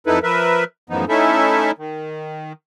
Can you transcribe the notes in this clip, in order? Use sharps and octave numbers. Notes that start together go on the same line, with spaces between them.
F2 D#4 E4 A4 B4
F3 A#4 B4 E5
F#2 A2 E3 F3 B3 D#4
A3 C#4 D#4 E4 A4 E5
D#3